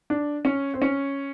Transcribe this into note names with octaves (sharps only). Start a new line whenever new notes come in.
D4
C#4
C4
C#4